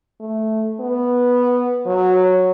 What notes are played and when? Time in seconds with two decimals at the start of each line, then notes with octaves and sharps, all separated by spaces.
0.20 A3
0.80 B3
1.86 F#3